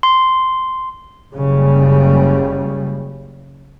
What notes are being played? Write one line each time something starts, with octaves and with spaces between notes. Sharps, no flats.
C6
F#1 C#3 G3